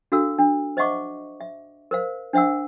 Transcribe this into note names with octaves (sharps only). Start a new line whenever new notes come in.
D4 F#4 A4 F5 E6
D4
C5 D#5 E5 F#5 C#6 D6
E5
A#4 C5 F5
D4 C5 E5 F#5 E6